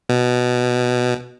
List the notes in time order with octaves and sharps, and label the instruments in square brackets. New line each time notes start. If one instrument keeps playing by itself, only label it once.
[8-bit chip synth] B2